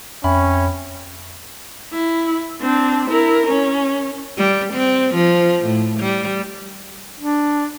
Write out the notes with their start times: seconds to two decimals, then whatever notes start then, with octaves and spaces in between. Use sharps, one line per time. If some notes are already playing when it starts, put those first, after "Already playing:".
0.24 F2 C#4 E5 G5 B5
1.93 E4
2.62 C4 D4
3.08 E4 A#4
3.47 C#4
4.37 G3
4.74 C4
5.15 F3
5.65 A2
6.00 G3
7.20 D4